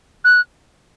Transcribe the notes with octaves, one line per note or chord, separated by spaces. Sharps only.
F#6